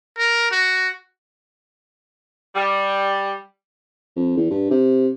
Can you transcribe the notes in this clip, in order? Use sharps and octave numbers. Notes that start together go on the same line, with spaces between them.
A#4
F#4
G3
F2
E2
G2
C3